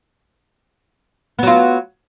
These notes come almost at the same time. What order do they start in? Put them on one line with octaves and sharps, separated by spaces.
B3 F#3 F4